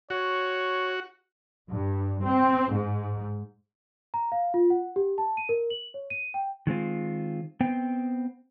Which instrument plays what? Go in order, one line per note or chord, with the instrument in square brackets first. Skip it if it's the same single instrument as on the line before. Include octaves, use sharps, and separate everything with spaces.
[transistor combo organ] F#4 [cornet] C#5
[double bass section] G2
C4
G#2
[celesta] A#5
F5
F4
F#5
G4
A5
D#7
A#4
F#7
C#5
D#7
G5
[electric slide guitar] D#3 G#3 C4 F4
B3 C4 G5